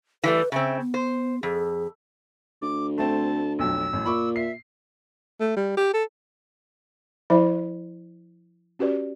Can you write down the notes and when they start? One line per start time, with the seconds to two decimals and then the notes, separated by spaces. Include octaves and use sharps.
0.24 E3 G3 A3 B4
0.52 C#3 C4 E5
0.80 B3
0.94 C5
1.43 F2 G#4
2.62 D2 D6
2.98 A3 C4 A5
3.59 B1 F2 F#3 E6
3.93 A1 F#2 A2
4.06 A#2 B5 C#6 D6
4.36 E5 C7
5.40 A3
5.57 G3
5.77 G4
5.93 A4
7.30 F3 E4 C5 E5 B5
8.79 C#4 F#4 G4 B4 D5